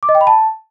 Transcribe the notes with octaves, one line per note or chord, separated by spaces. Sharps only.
D6
D#5
G5
B5
A5